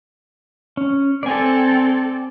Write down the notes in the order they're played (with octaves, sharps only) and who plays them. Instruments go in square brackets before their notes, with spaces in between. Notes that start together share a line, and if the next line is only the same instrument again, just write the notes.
[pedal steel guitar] C#4
[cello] C4 A4 [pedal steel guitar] D5 G#5